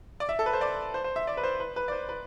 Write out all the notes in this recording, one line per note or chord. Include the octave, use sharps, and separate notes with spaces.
D5
E5
A4
B4
C5
D5
C5
C5
E5
D5
B4
C5
B4
B4
D5
C5
B4